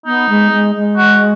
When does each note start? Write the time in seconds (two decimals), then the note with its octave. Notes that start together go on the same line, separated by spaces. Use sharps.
0.06 B3 D#4
0.29 G#3
0.52 G#3
0.75 G#3
0.97 F#4